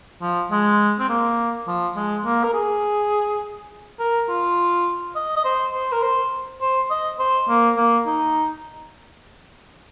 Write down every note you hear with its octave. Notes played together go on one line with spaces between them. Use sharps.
F3
G#3
C4
A#3
F3
G#3
A#3
A#4
G#4
A#4
F4
D#5
D#5
C5
C5
A#4
C5
C5
D#5
C5
A#3
A#3
D#4